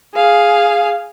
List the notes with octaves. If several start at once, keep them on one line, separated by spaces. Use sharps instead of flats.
G#4 F5